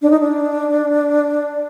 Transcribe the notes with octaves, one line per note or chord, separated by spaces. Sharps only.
D4
D#4
D4